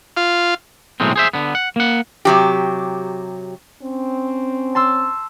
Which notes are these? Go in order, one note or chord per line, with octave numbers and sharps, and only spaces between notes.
F4
B1 A2 D#3 G#3 C4
G#4 C5 E5
D3 B3
F#5
A#3 F#5
C3 F#3 G4
C4 C#4
A5 C6 E6